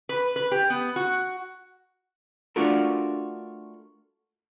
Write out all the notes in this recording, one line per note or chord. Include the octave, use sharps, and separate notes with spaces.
B4
B4
G4
B3
F#4
A3 D4 F4 F#4 A4 A#4